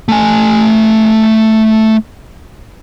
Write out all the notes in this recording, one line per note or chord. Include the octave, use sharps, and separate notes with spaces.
A3 G#5